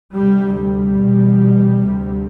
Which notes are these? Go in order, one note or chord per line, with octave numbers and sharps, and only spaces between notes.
D2 C3 G3
G3
E2 B2
D2 C3